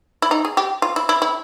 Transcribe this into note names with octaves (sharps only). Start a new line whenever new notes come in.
E4
D#4
G#4
G4
F4
E4
E4
E4